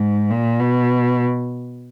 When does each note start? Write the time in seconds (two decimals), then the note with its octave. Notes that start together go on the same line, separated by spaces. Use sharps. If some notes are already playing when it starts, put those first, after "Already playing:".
Already playing: G#2
0.30 A#2
0.60 B2